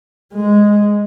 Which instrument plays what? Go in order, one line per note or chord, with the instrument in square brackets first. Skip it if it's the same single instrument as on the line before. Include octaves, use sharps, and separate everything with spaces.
[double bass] G#3